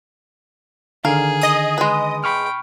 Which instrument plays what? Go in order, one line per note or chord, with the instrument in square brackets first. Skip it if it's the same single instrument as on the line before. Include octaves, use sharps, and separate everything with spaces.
[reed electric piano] D3 D#3 [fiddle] G#4 [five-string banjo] A#4 F5
[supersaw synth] D#5 D#6
[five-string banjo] G#3 B4
[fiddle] G5 [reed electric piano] B5 C#6 F6